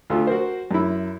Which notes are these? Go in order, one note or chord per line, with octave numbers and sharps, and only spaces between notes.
D2 A3 F4
F#4 A#4 C5
F#2 E4